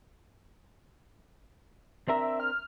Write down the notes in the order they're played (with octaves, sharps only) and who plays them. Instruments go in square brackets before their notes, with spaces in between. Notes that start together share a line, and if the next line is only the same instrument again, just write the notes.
[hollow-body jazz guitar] C4 D4 A#4 [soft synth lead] E5
[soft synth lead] F6